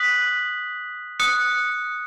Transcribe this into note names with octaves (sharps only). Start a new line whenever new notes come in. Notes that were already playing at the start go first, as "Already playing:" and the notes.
Already playing: D#6 F#6 B6 F#7
D#6 F#6 C#7